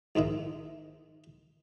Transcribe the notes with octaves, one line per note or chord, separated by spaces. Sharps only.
A#1 G#2 D#3 E4